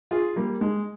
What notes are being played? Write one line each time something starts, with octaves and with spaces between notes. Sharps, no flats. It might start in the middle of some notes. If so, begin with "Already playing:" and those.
F4 G#4
G3 A#3
G#3